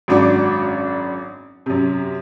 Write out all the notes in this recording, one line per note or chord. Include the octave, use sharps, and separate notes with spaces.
G#1 F#2 D4 F#4 D6
F#2 C3